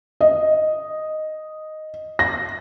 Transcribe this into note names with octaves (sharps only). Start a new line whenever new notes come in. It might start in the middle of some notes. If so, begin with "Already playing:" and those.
D#5
A#6